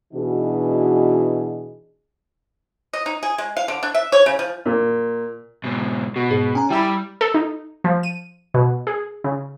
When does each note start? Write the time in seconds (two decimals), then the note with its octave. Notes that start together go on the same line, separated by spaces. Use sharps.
0.13 B2 E3 D4 D#4 F#4 G#4
2.93 D#5
3.06 D#4
3.23 G#4
3.38 G#3
3.57 F5
3.68 D3
3.83 D4
3.94 E5
4.12 C#5
4.26 C#3
4.39 F3
4.66 A#2
5.64 G#2 B2
6.16 B2 F#4
6.31 G#2 G#4
6.55 C#4 G#5 A#5
6.70 G3 E4 G5 B5 E6
7.21 A4
7.34 D#4
7.84 F3
8.03 D#7
8.54 B2
8.87 G#4
9.24 C#3